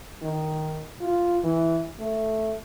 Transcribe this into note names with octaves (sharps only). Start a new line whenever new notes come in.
D#3
F4
E3
A3